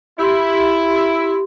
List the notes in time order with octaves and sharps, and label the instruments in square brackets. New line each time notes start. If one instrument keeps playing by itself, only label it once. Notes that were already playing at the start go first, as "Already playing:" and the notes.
[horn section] E4 [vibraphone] G4 C6